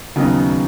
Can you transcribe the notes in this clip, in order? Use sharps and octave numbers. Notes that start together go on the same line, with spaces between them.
D#2 C#3 F#3 B3 D#4